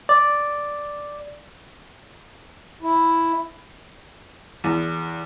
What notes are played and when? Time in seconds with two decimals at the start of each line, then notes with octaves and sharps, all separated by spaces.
0.09 D5
2.82 E4
4.64 E2